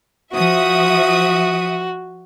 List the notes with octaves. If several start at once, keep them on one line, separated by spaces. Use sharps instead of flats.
F3 F#4 E5 D#6